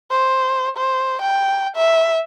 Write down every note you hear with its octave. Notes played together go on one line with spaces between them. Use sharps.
C5
C5
G5
E5